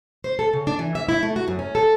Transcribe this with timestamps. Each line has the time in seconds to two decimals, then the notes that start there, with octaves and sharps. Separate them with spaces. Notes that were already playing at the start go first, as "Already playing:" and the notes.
0.24 C5
0.39 A4
0.53 C#3
0.67 D4
0.79 E3
0.95 E5
1.09 E4
1.23 A3
1.36 F#4
1.48 F#2
1.59 C#4
1.75 A4